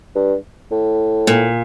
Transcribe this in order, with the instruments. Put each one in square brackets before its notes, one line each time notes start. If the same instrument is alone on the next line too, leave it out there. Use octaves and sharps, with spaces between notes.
[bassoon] G2
A2
[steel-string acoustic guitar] A#2